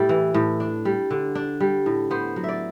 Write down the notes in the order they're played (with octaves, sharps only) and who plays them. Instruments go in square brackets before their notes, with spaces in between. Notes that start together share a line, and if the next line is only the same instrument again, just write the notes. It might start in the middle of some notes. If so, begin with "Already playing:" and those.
Already playing: [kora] A2 G3 D5 E5
E3
A2
D4
G3
D3
D4
G3
A2
B3 C5
F#3
D5 E5